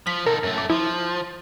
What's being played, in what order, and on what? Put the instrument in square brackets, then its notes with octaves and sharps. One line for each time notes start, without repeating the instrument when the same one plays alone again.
[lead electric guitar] F3 [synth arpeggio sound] B6
[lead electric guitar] D#4 A4 [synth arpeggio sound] A#4
[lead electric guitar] F#2 A3
[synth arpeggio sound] D6
[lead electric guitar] F3 [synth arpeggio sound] E4